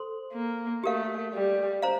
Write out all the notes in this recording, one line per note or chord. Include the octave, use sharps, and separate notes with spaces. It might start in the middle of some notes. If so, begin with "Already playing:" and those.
Already playing: A4 C5 C6
A#3
A3 G4 A#4 F5
G3
C5 F5 A#5